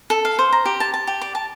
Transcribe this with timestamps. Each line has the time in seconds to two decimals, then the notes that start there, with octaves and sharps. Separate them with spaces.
0.10 A4
0.25 F5
0.39 C5
0.53 A#5
0.65 G4
0.80 A5
0.94 A5
1.07 G4
1.21 D5
1.35 A5